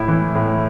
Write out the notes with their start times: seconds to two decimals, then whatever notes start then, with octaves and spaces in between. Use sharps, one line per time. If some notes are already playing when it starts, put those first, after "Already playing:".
Already playing: A2 E4
0.08 E3
0.35 A2